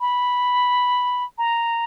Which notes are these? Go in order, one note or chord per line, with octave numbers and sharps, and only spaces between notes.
B5
A#5